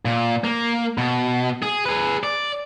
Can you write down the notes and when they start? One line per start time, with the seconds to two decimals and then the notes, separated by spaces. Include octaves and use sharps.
0.05 A#2
0.44 A#3
0.98 B2
1.62 G#4
1.85 G#4 B4
2.24 D5